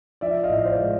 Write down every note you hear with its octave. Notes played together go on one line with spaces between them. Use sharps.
F3 D5 E5
D#5 F5
A2
C5 D5
G#3